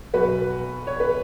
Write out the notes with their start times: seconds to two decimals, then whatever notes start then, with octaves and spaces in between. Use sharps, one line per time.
0.14 B1 B2 F#3 F#4 B4
0.87 C#5
1.00 B4